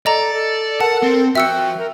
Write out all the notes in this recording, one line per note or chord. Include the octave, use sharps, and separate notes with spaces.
A4 D5 D#5 A#5
A4
A#4 F#5 A5
C4
F3 F#4 E5 G5 E6 C#7
A#4